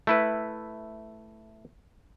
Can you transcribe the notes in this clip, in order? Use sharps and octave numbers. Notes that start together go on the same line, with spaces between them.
A3 E4 B4